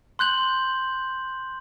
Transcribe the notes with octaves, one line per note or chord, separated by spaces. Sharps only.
C6 F#6 G6 F#7